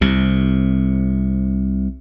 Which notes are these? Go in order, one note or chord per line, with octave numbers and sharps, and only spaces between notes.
C2 C3